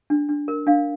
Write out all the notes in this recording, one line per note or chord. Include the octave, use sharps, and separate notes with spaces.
D4
D4
A#4
D4 F5